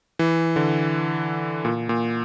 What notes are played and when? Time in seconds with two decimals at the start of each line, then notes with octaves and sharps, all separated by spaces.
0.19 E3
0.56 D3
1.65 A#2
1.89 A#2